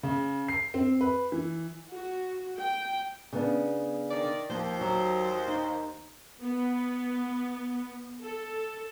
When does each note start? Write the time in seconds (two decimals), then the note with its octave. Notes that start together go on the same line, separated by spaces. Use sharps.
0.03 C#3
0.48 C7
0.74 C4
1.01 B4
1.32 E3
1.91 F#4
2.59 G5
3.33 C#3 B3 D4
4.10 D#3 D5
4.49 D#2 F3 A#3 C5
4.81 F#3
5.48 D#4
6.42 B3
8.21 A4